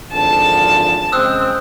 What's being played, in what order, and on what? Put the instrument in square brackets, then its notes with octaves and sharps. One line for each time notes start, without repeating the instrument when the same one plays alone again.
[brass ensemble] G#1 D3 F3 [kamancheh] A5
[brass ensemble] C#3 G#3 C4 [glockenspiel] D#6 E6 F#6